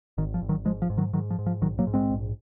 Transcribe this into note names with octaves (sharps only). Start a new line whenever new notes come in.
G#1 D#3
F3
G#1
D#3 F#3
G#2 F3 G#3
F3
G#2
D#3 F#3
G#2 D#3 F#3
F3
G#2
F3
A#1 D#3 F#3
F#3 A#3
G#2
G#3 C4
A#1